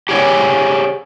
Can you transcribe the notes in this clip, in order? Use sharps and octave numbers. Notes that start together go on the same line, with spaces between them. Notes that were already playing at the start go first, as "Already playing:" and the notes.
G4 G#4 C#5 D5